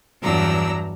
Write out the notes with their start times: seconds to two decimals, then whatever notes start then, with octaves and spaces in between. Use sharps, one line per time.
0.22 E2 G2 F#3 D4 A#5 E6